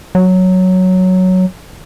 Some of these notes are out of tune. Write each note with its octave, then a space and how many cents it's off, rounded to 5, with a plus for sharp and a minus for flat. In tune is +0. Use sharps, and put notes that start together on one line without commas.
F#3 +0